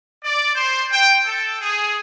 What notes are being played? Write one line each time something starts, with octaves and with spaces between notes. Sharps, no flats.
D5
C5
G5
A4
G#4